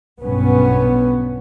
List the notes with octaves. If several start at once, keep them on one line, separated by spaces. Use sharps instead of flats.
B1 G2 B3 C#4